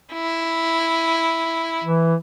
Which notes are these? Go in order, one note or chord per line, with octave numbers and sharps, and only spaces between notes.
E4
E3